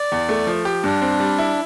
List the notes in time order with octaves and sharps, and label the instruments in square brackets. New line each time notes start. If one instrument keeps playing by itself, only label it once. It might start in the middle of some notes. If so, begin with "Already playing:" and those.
Already playing: [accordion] D5
[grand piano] E2
A3
F3
G4
[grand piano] G2 [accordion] D4
[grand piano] C4
G3
E4